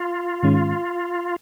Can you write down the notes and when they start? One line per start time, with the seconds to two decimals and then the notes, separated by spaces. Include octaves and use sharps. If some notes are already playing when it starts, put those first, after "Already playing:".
Already playing: F4
0.43 G#2 D#3 G#3 C#4